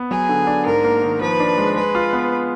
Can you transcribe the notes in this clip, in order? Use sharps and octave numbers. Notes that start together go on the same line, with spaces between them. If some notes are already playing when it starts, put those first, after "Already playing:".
Already playing: B3
F#3 G#4
D3
D4
G#2 A#4
A#3
D#3
F3 B4
D4
G#3
G#3 B4
F4
B3